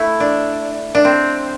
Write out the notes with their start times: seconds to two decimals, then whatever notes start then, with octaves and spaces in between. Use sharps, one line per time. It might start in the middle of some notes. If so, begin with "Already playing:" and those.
Already playing: A3 E4
0.20 D4
0.95 D4
1.05 C4